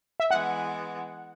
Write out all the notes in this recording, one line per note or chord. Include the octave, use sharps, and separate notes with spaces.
E5
E3 G#3 B3 F#5